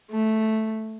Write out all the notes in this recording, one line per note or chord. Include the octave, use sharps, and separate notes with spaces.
A3